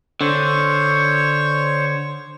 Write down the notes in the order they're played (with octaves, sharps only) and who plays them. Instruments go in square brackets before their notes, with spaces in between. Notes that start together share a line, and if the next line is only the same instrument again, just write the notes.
[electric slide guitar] D3 [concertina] C5 C#5 C#6